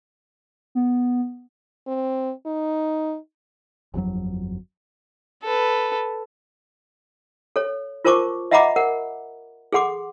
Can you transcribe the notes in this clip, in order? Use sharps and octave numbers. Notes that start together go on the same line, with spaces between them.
B3
C4
D#4
G1 F2 A2 F#3
A4 B4
A4 C#5
F4 A#4 C5 A5 C#6 D6
D#5 E5 F#5 A#5 B5 D6
A#4 F#5
G#4 A4 F#5 C6 D6